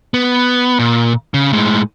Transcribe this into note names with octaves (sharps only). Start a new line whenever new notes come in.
B3
A#2
C#3
A2 G#3